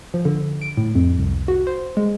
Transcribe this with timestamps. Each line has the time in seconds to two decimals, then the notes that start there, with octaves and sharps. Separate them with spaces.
0.14 F3
0.25 D3
0.62 D7
0.77 A2
0.95 F2
1.18 C2
1.48 F#4
1.67 C5
1.97 G#3